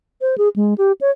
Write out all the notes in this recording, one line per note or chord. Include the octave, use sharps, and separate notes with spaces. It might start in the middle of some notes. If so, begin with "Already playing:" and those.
C5
G#4
G#3
G4
C#5